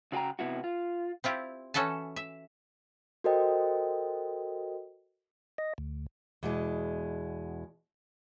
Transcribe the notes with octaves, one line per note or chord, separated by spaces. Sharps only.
C#3 F#4 G4 G5 A#5
C3 B3 E4 F#4
F4
C4 E4 F4 G4
E3 C#4 F#4 A4 E5 A5
E5
F#4 A4 A#4 C5 D#5 G5
D#5
D2
E2 B2 G#3